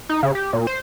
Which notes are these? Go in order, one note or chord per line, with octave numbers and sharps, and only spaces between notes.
D#4
C#3
G4
A#2
C5